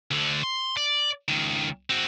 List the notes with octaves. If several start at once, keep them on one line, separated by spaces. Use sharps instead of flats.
D2 D3
C6
D5
C#2 D#3
C4 F#4